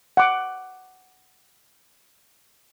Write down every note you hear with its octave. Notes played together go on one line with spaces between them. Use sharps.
F#5 D6